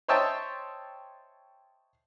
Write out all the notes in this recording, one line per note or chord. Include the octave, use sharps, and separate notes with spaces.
C5 C#5 D#5 E5 G5 A5